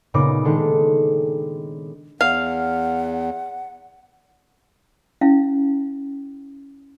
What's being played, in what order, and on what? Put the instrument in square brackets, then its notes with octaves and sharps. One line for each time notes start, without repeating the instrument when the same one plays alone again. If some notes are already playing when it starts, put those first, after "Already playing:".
[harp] A#2 C#3 B3 D#4 D6 A#6
D#3 G#3 D4 A4
[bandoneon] E2 [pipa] F5 [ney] F#5
[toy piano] C#4 E4 F5